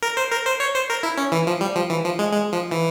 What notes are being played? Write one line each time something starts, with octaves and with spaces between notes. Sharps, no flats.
A#4
C5
A#4
C5
C#5
C5
A#4
E4
C#4
E3
F3
G3
F3
E3
F3
G#3
G#3
F3
E3